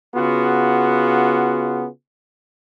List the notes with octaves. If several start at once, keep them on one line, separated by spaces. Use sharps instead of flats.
C#3 B3 F4 F#4 G#4